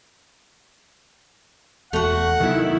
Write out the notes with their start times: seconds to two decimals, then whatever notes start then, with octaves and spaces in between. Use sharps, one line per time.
1.93 E1 E2 A3 F#4 F#5
2.40 C3 D#3 F#3 B3 E4